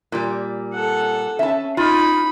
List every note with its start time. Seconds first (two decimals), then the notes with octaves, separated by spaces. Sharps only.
0.12 A#2 G3
0.73 A4 F#5
1.39 C#4 E5 A5
1.77 D#4 F4 B5